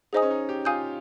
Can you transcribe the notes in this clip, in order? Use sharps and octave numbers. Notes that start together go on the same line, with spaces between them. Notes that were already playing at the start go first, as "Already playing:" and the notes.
D#4 G#4 C5 D#5 G#5 D#6
C#4
D#4
G4
F4 F5 G#5 D#6 G6